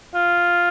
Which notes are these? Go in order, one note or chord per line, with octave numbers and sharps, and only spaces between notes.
F4